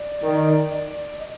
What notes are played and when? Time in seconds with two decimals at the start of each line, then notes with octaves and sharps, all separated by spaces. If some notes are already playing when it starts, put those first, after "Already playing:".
Already playing: D5
0.23 D#3
1.19 D#5